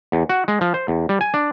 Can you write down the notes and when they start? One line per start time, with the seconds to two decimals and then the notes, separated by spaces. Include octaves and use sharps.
0.12 E2
0.29 F#4
0.48 G#3
0.61 F3
0.74 C5
0.88 E2
1.09 G3
1.21 G#5
1.34 D4